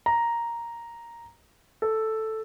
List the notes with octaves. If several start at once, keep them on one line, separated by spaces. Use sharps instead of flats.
A#5
A4